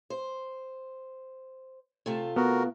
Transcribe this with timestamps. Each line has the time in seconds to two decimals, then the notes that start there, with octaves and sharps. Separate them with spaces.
0.10 C5
2.06 C3 A3 F4
2.36 B3 F#4 A#4